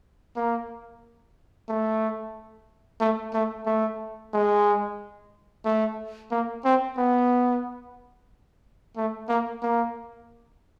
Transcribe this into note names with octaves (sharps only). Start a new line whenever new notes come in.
A#3
A3
A3
A3
A3
G#3
A3
A#3
C4
B3
A3
A#3
A#3